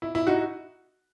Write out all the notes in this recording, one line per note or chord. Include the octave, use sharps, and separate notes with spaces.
E4
E4
D#4 F#4